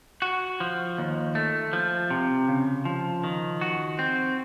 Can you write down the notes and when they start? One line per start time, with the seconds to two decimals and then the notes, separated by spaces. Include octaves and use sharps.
0.22 F#4
0.60 F3
0.98 D#2
1.35 A3
1.73 F3
2.10 C3
2.49 C#3
2.85 F3
3.24 D#3
3.61 F#4
3.99 C4